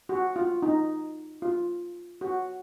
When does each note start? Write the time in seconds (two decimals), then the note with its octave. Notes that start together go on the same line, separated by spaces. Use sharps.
0.09 F#4
0.36 F4
0.63 D#4
1.42 F4
2.21 F#4